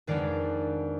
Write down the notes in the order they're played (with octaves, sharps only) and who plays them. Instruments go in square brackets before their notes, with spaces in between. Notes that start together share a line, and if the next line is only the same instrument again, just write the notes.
[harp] F2 D#3 G#3 B3 D4 D5 F5